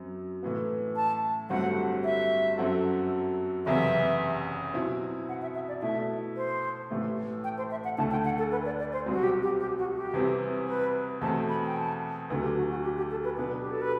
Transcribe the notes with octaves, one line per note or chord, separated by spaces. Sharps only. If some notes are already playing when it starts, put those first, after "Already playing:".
Already playing: F#2 F#3 C4
A2 E3 B3
A5
G1 G2 F#3 A3 C4 F#5
E5
F#2 F#3 C4 F#4 A4
F#1 E2 C3 E3 E5
B2 F#3 C4 E4
F#5
E5
E5
D5
B2 A3 E4 E5
C5
A1 A2 E3 A3
G5
C5
E5
F#5
D2 D3 A3 A5
G5
F#5
A4
B4
D5
D5
C5
C2 B2 F#3 C4
F#4
G4
G4
G4
F#4
G4
E2 C3 E3 G3 C4
B4
E2 B2 A3 C4 A5
B5
G5
A5
D2 D3 F#3 B4
G4
F#4
F#4
G4
G4
A4
B4
B2 F#3 B3 D4 B4
G4
A4
B4